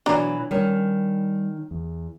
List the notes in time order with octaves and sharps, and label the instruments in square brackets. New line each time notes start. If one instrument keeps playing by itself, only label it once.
[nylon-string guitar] B2 E3 F#3 [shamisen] D4 A#5
[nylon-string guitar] D#3 C#4 [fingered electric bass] G3
[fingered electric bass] E2